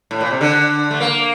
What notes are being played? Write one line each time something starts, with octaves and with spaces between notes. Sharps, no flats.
A2
A#2
C3
D3
A3
A#3